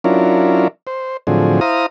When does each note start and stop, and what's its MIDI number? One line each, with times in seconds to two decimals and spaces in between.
0.04 0.68 54
0.04 0.68 61
0.04 0.68 62
0.04 0.68 64
0.04 0.68 65
0.04 0.68 70
0.87 1.17 72
1.27 1.60 45
1.27 1.60 50
1.27 1.60 53
1.27 1.60 54
1.27 1.60 60
1.27 1.60 68
1.61 1.86 64
1.61 1.86 72
1.61 1.86 77
1.61 1.86 82
1.61 1.86 87